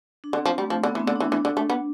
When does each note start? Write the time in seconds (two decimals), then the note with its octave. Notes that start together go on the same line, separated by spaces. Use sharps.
0.24 D4
0.33 D3 C4
0.46 F3
0.58 G3 A3
0.70 F3
0.83 D3 B3
0.95 E3
1.00 C4
1.07 D3
1.16 E3 D4
1.32 E3 D4
1.45 D3
1.57 A3
1.70 B3